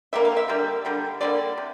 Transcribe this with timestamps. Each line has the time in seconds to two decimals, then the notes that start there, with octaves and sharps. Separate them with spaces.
0.13 D3 G3 A#3 E5
0.25 F5
0.37 E5
0.48 D3 G3 A#3
0.85 D3 G3 A#3
1.21 D3 G3 A#3 D5
1.58 C3